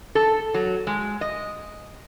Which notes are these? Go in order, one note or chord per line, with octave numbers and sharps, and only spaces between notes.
A4
F#3
G#3
D#5